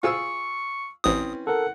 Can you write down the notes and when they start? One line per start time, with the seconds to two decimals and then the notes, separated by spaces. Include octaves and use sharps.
0.03 F4 G#4 C#6 E6
1.04 A1 E3 C4 C#4 D#6
1.47 A4 A#4 F#5